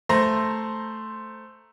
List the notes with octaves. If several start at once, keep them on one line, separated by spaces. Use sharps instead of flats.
A3 C5 A#5 A#6